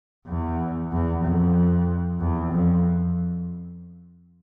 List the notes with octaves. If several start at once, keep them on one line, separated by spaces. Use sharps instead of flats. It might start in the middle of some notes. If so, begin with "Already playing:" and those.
E2
E2
F2
E2
F2